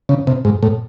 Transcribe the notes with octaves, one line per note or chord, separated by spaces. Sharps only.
C#3
C3
G#2
A2